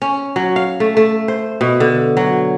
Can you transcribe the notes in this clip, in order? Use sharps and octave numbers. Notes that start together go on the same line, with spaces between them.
C#4
F#3
F5
A3
A3
C5
B2
D3
F#3